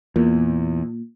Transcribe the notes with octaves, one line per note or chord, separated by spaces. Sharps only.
E2 A#2